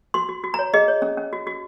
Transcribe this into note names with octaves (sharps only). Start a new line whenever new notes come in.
F#4 C6
F#4
F#4
C#5 A#5
G#4 D#5
C#5
C#4
C#4
F#4
F#4